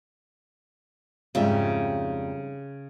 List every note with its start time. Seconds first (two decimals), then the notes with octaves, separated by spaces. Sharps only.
1.35 F2 G#2 C#3 G3 E5